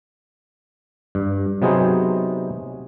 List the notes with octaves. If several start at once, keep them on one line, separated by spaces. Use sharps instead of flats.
G2
C3 F#3 B3 D#4 G#4 C5